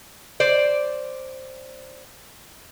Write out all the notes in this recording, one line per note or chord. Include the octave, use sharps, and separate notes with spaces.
C5 D5